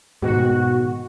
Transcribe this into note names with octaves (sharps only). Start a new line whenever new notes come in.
G#2 B2 D#3 F#4